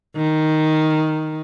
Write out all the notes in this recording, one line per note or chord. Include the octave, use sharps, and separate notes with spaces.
D#3